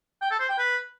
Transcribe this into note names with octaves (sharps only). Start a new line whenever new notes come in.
G5
A4
C5
G5
B4